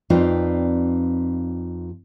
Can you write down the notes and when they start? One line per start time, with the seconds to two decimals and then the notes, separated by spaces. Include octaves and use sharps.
0.10 F2 C4 D#4 F4 B4 D5